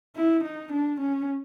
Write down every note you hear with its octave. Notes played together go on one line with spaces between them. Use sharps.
E4
D#4
D4
C#4